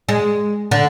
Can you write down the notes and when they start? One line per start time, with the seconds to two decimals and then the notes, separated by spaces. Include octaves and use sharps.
0.09 G#3
0.71 D3